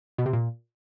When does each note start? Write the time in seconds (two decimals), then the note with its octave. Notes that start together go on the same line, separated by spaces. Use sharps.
0.18 B2
0.26 C3
0.33 A#2